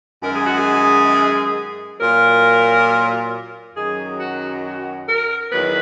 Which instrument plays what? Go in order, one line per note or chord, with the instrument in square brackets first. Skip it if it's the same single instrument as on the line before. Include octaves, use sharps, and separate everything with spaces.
[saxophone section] F#2 D#3 G#3 A#4
G#4
F#4
G#4
A#2 F#3 A#4
F#2 D#3 F#3 G#4
F#4
F#4
A#4
E2 D#3 F#3 B4